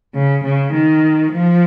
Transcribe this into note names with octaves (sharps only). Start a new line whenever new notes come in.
C#3
C#3
D#3
F3